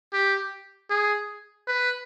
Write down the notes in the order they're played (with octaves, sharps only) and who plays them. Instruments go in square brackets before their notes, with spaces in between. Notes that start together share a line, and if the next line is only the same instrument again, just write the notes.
[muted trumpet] G4
G#4
B4